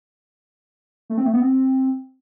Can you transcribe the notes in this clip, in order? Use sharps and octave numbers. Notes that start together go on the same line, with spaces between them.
A3
C4
A3
B3
C4